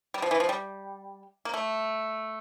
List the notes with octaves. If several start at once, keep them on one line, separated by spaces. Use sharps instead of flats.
G3
F3
E3
F3
G3
A#3
A3